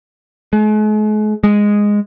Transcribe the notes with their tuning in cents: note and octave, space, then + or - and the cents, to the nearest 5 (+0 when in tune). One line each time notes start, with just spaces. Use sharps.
G#3 +45
G#3 -5